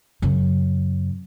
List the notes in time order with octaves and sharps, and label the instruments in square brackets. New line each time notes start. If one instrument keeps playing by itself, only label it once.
[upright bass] F#2 C#3